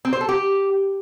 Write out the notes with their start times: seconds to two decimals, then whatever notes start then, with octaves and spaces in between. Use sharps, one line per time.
0.05 C4
0.13 C5
0.21 A4
0.29 G4